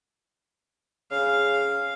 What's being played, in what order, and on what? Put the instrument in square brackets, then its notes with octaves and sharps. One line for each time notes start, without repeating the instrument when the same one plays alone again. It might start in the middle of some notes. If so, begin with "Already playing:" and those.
[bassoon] C#3 [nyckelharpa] F5